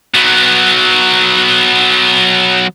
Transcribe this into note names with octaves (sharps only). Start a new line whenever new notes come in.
F#3 B3